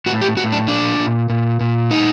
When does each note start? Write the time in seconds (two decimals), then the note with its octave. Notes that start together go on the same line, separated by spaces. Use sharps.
0.06 A2 F#4
0.21 G4
0.37 A2 F#4
0.52 D4
0.68 A#2 D4
0.99 A#2
1.30 A#2
1.60 A#2
1.91 A2 D#4